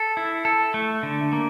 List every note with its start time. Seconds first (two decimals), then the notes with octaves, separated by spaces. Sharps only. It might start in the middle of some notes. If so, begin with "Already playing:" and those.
Already playing: A4
0.17 E4
0.45 A4
0.74 A3
1.03 D3
1.33 A#3